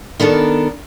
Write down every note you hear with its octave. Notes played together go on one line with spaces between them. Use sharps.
D#3 B3 D4 A4 A#4